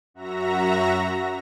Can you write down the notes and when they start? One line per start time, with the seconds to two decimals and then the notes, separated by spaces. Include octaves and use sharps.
0.14 F#2 F#4 E5 A#5 A#6